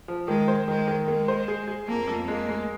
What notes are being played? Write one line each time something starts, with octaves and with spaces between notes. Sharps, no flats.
F3
D#3 G#3
C5
D#3 G#3
D#3
G#3 A#3
C5
G#4
G#4
F2 A#3
F2
G#3 A#3
G#3